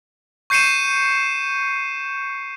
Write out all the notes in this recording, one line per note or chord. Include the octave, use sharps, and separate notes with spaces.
C#6 G6 C7 C#7 D#7 E7